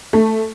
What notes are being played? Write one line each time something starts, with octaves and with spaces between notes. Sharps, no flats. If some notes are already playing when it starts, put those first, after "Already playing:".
A3